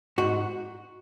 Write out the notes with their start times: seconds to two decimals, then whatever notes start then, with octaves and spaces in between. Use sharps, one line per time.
0.18 G#2 F#4